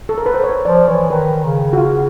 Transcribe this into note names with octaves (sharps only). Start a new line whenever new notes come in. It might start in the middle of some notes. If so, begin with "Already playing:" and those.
A4
A#4
B4
C5
C#5
F3 D5
E3 C#5
D#3 B4
C#3
F#4
F4